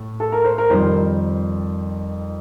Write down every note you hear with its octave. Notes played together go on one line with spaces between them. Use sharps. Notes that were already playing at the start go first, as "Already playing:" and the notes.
Already playing: A2
A4
A#4
C5
A#4
F2 D#3 G3 C5